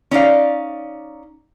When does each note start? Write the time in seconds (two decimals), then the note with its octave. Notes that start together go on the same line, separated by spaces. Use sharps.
0.11 C#4 D#4 D5 F5